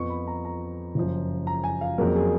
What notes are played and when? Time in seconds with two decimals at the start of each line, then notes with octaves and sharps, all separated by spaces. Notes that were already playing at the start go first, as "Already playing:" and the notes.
Already playing: F2 F3 B3 C#6
0.10 B5
0.27 A#5
0.45 A#5
0.95 F#1 F#2 F3
1.47 A#5
1.64 G#5
1.81 F5
1.98 F2 C#3 F#3 A#3 A#4
2.16 G#4